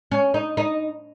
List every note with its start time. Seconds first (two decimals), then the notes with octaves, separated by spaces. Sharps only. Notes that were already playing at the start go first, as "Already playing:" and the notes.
0.12 C#4
0.34 D#4
0.57 D#4